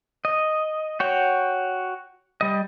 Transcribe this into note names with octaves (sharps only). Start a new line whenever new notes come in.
D#5
F#4 C#5 G5
G3 D#5